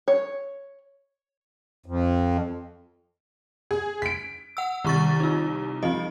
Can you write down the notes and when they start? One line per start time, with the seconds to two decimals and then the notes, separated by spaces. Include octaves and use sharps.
0.08 C#5
1.86 F2
3.71 G#4
4.02 B6 D7
4.57 F#5 E6
4.85 C2 D#3 C#6 A6
5.20 D#4 F4
5.83 F3 C4 D#5